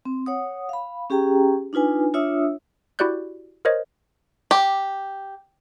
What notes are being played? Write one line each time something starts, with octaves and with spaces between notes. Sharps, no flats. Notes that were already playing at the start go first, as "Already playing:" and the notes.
C4
C#5 F#5 D#6
F5 B5
C#4 G4 G#4 G5 A#5
D4 D#4 F4 B4 G#5
D4 F4 C#5 E5 D#6 E6
E4 F#4 G4 D5 F#6 G6
A#4 C5 C#5 D#5
G4